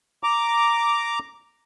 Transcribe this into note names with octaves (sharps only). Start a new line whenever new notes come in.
A#5 D6